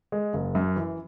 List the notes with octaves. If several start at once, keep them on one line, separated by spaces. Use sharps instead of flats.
G#3
F#1
F#2
E3